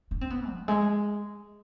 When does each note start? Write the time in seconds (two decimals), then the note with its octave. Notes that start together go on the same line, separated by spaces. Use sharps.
0.11 D4
0.21 C4
0.30 B3
0.49 F3
0.68 G#3